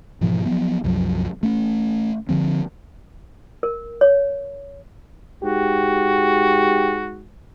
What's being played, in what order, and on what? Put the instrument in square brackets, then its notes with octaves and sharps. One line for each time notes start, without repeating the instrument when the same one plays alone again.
[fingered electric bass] G#2 B2 E3 F3
F3 F#3 B3
C2 F#2 F3 F#3
A3 C#4
D3 E3 F3 C4
[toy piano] A#4
C#5
[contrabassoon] G#2 [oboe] F#4 [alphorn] G4